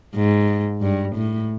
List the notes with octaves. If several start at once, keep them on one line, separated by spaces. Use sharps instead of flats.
G#2
G2
A2